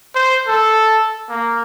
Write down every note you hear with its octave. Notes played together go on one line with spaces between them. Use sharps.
C5
A4
A#3